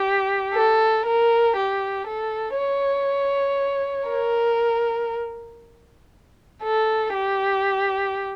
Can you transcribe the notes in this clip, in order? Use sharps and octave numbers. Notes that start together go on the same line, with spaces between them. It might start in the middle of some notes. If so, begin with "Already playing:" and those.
Already playing: G4
A4
A#4
G4
A4
C#5
A#4
A4
G4